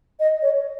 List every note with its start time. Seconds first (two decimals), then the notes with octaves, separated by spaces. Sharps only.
0.20 D#5
0.42 C#5